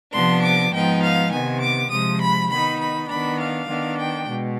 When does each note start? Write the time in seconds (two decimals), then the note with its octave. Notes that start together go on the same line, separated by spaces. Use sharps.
0.13 C3 F3 B3 D4 C6
0.42 D6
0.72 G#2 F3 B3 D#4 G5
1.02 F5
1.32 C3 D#3 B3 G#5
1.61 D6
1.91 C3 F3 G#3 D#6
2.21 B5
2.50 D#3 B3 D#4 B5
2.80 B5
3.09 D#3 B3 D4 B5
3.40 F5
3.69 D#3 B3 D4
3.98 G5
4.28 B2 G#3